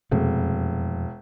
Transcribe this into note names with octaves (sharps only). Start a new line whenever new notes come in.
E1 F2 C3 A3